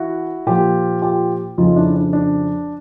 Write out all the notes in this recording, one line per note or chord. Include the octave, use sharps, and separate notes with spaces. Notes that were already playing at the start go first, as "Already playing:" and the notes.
Already playing: E3 E4 F#4
A#2 F3 F4 G4
F4 G4
F2 C#3 F3 D#4 F4
D4 E4
D4
D4